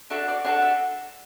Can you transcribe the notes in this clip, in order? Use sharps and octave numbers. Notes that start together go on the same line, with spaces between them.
D4 F#4 A4 E5
D5
D4 F#4 A4 C#5
E5